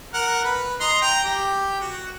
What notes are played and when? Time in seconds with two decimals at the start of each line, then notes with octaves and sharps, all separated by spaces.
0.14 A#4 F#5
0.44 B4
0.81 D#5 A#5 C6
1.02 G5 A#5
1.24 G4
1.81 F#4